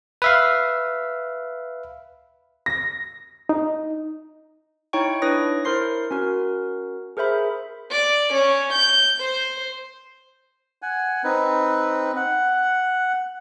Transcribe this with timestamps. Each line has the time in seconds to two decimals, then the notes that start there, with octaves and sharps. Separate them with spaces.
0.22 B4 E5 F5
2.66 A#6
3.49 D#4
4.93 D#4 E4 C#5 G5 C#6
5.22 D4 E4 B4 C#5 D#6 A#6
5.65 E4 A#4 C5 C6 C7
6.11 C#4 F#4 A#4
7.17 G#4 A#4 C5 E5 B5
7.91 D5
8.33 C#4
8.73 G6
9.20 C5
10.82 F#5 G#5
11.24 C4 D#4 B4
12.16 F#5